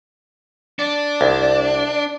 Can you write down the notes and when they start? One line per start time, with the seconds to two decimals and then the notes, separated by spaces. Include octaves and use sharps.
0.79 D4
1.21 C2